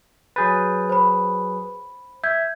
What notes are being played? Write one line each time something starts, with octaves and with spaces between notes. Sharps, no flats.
F#3 G#4 B4 G6 A6
C5 B5
E5 G6 G#6